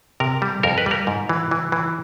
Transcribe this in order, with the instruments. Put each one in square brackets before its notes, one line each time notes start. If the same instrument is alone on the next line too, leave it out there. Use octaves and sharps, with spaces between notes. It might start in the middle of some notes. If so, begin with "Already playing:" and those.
[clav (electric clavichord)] C3 A#4
G3
F2 A#4
B4
G3 A#4
G#2
E3
E3
E3